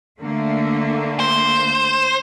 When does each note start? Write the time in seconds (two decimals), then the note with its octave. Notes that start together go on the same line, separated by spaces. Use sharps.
0.20 D3 A3 A#3
1.20 C5